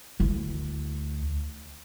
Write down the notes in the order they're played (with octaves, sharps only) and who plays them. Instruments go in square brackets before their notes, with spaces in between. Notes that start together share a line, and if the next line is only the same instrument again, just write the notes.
[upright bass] D2 E4